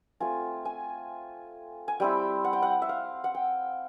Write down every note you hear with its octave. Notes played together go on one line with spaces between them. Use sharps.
A3 C4 F4 G#5
G#5
G#5
G3 C4 E4 G5
F#5
G5
F#5
E5
F5
F#5
G5